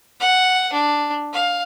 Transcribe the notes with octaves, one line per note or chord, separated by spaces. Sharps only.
F#5
D4
F5